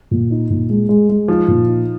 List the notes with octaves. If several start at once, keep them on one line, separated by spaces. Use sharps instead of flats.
A#2
D#4
A#2
G#3
G#3
G#3
F3 D#4
A#2
D#4